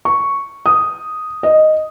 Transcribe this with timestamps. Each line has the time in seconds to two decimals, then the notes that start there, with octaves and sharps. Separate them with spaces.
0.05 C#6
0.66 D#6
1.43 D#5